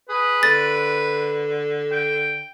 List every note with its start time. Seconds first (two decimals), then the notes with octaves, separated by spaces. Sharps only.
0.09 G#4 B4
0.43 D3 A6
1.92 G5